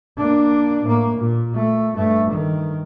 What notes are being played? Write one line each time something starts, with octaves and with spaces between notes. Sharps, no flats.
A#3 D4
A2 A#3
A#2
A3
G2 A3
D#3